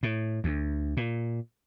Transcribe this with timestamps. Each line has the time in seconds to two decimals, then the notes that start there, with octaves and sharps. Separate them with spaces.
0.03 A2
0.44 D2
0.97 A#2